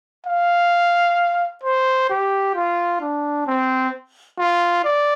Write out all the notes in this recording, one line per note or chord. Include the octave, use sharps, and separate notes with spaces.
F5
C5
G4
F4
D4
C4
F4
D5